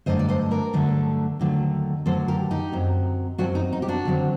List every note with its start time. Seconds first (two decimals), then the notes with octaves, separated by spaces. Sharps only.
0.06 G2 D3 F#3 A3 D4 C5 D#5
0.19 D5
0.29 C5 D#5
0.51 A#4 D5
0.73 G2 D3 F#3 A3 D4
1.39 D#2 D3 F#3 A3
2.06 D#2 D3 F#3 A3 A4 C5
2.28 G4 A#4
2.51 D#4 G4
2.72 F#2 F#3 C4
3.38 F#2 F#3 C4 D4 F#4
3.55 D#4
3.73 D#4
3.82 G4
3.88 D4 F#4
4.05 D#2 D3 F#3 C4